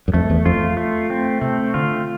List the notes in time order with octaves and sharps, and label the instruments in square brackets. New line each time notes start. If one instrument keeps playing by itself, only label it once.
[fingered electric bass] F#2
[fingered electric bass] F2 [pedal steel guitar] A3
[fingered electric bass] E2
[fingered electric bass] F2 [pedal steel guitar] F4
[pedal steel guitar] A3
C4
[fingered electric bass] C3 [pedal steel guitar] A3
[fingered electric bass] D3 [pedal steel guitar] F4